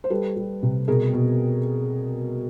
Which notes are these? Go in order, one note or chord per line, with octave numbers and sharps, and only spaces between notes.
C5
G3 A4 B4
G3
C3
B2 G#4 A#4
B2